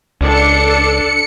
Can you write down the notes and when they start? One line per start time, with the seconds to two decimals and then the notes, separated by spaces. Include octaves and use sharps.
0.21 C#2 D4 A4 C#7